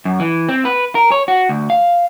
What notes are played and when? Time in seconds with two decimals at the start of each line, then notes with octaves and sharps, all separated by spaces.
0.05 F#2
0.20 E3
0.49 C4
0.65 B4
0.95 A#4
1.12 C#5
1.28 F#4
1.49 D2
1.70 F5